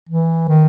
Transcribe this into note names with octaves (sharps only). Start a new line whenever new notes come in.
E3
D#3